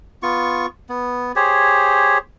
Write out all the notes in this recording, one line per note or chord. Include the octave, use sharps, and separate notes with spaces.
B3 F4 C#6
B3
G4 G#4 C5 C#5